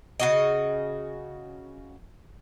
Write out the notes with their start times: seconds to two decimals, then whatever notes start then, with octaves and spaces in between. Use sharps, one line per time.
0.20 C#3 F#4 D#5